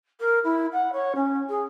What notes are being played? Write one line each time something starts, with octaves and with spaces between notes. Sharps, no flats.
A#4
E4
F#5
C#5
C#4
G#4